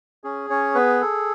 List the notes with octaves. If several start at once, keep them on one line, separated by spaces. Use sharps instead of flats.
C#4 G#4
C#4 C#5
B3 B4
A4